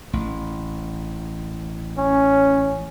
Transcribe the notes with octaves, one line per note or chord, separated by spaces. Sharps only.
A1
C#4